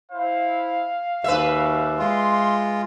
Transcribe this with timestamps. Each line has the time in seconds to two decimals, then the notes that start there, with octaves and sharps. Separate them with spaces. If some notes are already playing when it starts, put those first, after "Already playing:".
0.11 E4 C5 F5
1.24 D#2 G3 F#4 B4 E5
1.99 G#3 F4 C6